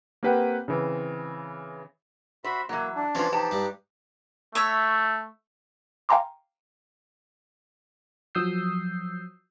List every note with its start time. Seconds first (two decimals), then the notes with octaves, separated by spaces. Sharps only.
0.23 A#3 C4 G4 B4 F#5 G5
0.68 C#3 E3 C4
2.44 F#4 C5 E5 B5
2.69 E3 F#3 A#3
2.95 D4
3.15 E3 F3 C4 C#4 F4
3.33 D#4 G4 A5
3.51 G2 D4
4.55 A3 C#5 E5
6.09 F5 G5 G#5 A#5 C6 D6
8.35 F3 F#3 D#6 E6 G6 C7